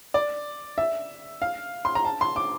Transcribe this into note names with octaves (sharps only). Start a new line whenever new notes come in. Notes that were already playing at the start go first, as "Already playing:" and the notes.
D5
E5
F5
C6
A#5
A5
C6
D6